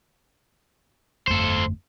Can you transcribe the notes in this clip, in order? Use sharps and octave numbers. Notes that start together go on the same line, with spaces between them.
G1 F2 A3 A4 C5